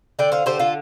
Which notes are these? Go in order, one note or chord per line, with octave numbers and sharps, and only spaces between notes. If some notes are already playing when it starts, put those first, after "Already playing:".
D3 D5 G5
C5 F5
D3 G4 C5
F4 A4